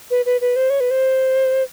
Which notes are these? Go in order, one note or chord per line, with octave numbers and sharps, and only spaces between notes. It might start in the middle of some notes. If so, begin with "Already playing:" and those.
B4
B4
B4
C5
C#5
B4
C5